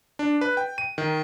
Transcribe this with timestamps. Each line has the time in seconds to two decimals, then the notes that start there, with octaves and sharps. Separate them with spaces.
0.19 D4
0.41 B4
0.57 G5
0.78 D#7
0.98 D#3